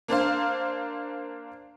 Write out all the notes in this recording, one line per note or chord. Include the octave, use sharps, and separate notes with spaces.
A#3 D4 C5 F5